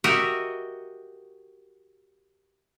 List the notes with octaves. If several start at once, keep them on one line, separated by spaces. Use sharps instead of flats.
F#4 G4 A#4 D#5 E5